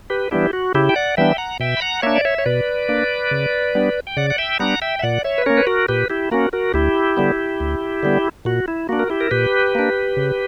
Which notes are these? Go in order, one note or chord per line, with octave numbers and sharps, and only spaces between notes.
G4 B4
E3 G3 B3 D4 E4 G4
F#4
C#3 E4 G4
G5
D5 F#5
E3 G3 B3 D4 E5 G5
F#5 A#5
B2 E5 G5
B5
F#5 A#5
A#3 D4 C#5 E5
D5
C#5 E5
C#5
B2 B4 D5
A#3 D4
C#3
G3 B3 D4
G5
C#3 D5 F#5
F#5
E5 G5
G3 B3 D4 F#5 A#5
E5 G5
E5
A#2 D5 F#5
C#5 E5
B4
A#3 C#4 A#4 C#5
B4
F#4 A#4
A#2 G4 B4
E4 G4
A#3 C#4 F#4 A#4
F#4 A#4
D2 E4 G4
D3 G3 B3
D2
D3 G3 B3
A#2 F#4
E4
A#3 D4 F#4
A#4
E4 G4
A#4
A#2 G4 B4
A#3 D4
C#3